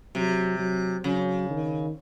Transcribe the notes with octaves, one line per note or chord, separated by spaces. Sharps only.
C3 F#3
F#3
C#3 F#3
D#3